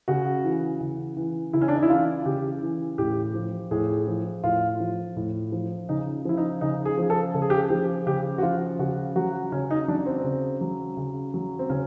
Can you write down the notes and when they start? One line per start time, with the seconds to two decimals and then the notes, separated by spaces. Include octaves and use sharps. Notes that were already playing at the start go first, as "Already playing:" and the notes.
0.08 C#3 F#4
0.44 E3
0.81 C#3
1.17 E3
1.53 C#3 E4
1.61 C#4
1.68 D4
1.75 D#4
1.83 E4
1.90 E3 F4
2.25 C#3 G4
2.62 E3
2.98 A2 G4
3.35 F3
3.71 A2 G#4
4.07 F3
4.44 A2 F4
4.80 F3
5.16 A2
5.52 F3
5.89 C#3 D#4
6.25 F3 E4
6.37 D#4
6.61 C#3 D#4
6.85 G#4
6.98 F3
7.10 A4
7.34 C#3 A4
7.42 G#4
7.50 G4
7.58 G#4
7.70 F3 G4
8.06 C#3 G4
8.38 F#4
8.43 F3 F4
8.79 C#3 F#4
9.16 F#3 F#4
9.52 C#3 C#4
9.71 D#4
9.88 F#3 D4
10.06 C4
10.24 C#3
10.61 F#3
10.97 C#3
11.34 F#3
11.59 C4
11.70 C#3 C#4